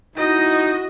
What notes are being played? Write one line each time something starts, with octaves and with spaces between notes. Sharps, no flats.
D#4 E4 F#4 D#5